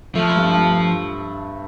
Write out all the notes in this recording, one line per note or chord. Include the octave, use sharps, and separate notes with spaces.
F3 A3
G2
G2